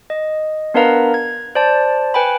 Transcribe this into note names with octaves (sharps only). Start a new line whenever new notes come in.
D#5
B3 D4 A#4 B4 F5 A#5
G#6
C5 D5 A5
B4 G5 G#5 B5